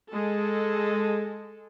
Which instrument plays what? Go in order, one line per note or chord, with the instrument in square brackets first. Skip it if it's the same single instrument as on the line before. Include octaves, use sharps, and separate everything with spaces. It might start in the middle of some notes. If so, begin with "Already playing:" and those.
[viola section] G#3 A4